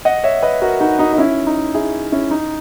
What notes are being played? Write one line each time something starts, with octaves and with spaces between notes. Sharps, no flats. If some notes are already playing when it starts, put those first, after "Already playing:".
D#5 F#5
C#5 E5
B4 D#5
F#4 A#4
D#4 F#4
D#4 F#4
D#4
C#4 E4
D#4
E4 G#4
C#4 E4
D#4